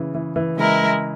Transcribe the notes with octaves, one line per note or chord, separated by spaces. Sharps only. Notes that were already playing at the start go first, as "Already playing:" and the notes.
Already playing: C#3 E3
E3
E3
C#3 G#3 E4 A#4